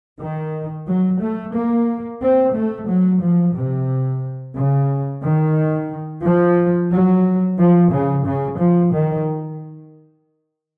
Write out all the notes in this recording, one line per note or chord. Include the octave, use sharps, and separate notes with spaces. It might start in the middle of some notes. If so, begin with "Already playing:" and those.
D#3
F#3
A3
A#3
C4
A3
F#3
F3
C3
C#3
D#3
F3
F#3
F3
C#3
C#3
F3
D#3